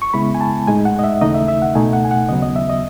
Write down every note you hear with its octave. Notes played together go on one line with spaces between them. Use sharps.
C#6
C#3 G#3 B3 E4 B5
G#5
A5
A2 G#3 D#4 G#5
F#5
D#5
E5
D#2 C#3 E3 A3 D#4 D#5
E5
E5
F#5
C#2 B2 A3 D#4 G#5
F#5
G#5
F#5
D#2 C#3 F#3 B3 D#5
D#5
E5
D#5